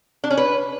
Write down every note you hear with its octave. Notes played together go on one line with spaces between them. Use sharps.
D4
C#4
B4